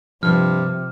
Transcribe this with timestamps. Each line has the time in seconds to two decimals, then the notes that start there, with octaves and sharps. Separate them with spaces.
0.23 G2 C3 F3 F6